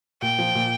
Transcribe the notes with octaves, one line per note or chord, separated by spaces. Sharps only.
A#2 G5
F3
A#2